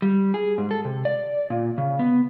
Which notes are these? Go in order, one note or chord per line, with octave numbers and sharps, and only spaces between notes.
G3
G#4
G#2
A4
C3
D5
A#2
C#3
B3